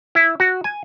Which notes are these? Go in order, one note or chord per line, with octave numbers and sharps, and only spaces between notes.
E4
F#4
G#5